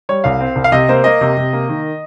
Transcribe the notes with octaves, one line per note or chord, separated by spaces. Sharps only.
G3 C#5
C2 F5
C4
C2
F5
C3 D#5
A#3 C5
A#3 D#5
C3
C3
A#3
D#3